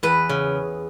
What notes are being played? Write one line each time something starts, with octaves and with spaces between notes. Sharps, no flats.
E2 B4
C#3